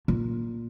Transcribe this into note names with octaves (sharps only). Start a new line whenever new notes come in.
A#2